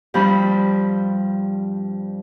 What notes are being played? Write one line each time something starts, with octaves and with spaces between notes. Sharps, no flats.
G2 F3 G3 C4 B5